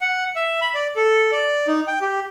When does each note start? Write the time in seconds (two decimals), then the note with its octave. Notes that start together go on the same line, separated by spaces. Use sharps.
0.01 F#5
0.36 E5
0.61 B5
0.75 D5
0.96 A4
1.32 D5
1.67 D#4
1.87 G5
2.01 G4